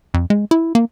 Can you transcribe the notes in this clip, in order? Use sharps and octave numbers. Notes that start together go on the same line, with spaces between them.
F2
G#3
E4
A#3